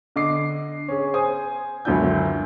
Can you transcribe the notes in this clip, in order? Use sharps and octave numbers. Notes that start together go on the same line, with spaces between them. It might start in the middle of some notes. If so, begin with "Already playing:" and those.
D3 D#5 D6 C7
C#4 G#4
C5 G#5 D#6
C#2 F#2 D3 E4 G#5 G6